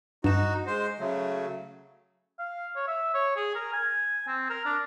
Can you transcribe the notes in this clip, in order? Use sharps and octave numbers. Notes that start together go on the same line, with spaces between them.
G2 D#4 F#4 E7
G#3 C5
C#3 F#3 A3
F5
C#5
E5
C#5
G#4
A#4
G#5
C4
A#4
D4